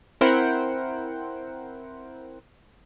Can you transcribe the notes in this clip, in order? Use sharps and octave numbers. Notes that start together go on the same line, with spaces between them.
C4 E4 A#4 C5 F#5 G5